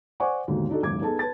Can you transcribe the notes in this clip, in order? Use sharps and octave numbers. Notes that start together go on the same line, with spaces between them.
C5 D5 F#5 G#5 C#6 D6
D#2 G#2 B2 D3
D4 D#4 F#4 A4
F#1 D#2 G#2 D6 G#6
B3 D#4 G#4 A4 B4 A5
B4 A5 A6